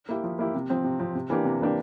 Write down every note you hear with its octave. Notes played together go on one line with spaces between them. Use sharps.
A#3 E4 G4
F3
A#3 E4 G4
C3
F3 C4
C3
F3 C4
C3
E3 A#3 D4 G4
C3
E3 A#3 D4 G4